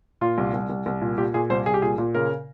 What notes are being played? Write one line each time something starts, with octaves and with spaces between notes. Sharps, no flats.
A#2 F4
C2
C2
C2
C2
A#2
A#2 G4
A#2 G#4
C2 C5
C2 G#4
G4
A#2 G#4
A#2
C#3 A#4